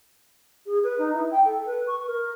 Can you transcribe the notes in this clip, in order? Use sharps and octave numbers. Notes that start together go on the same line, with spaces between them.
G#4
B4
D#4
E4
G5
A4
B4
C#6
A#4